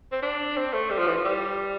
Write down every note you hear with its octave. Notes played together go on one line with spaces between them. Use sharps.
C4
D4
C4
A3
G3
F3
E3
F3
G3